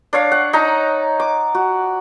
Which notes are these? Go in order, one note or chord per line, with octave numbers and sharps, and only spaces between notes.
D4 C#5 F5
F#5
D#4 A5 A#5
D6
F#4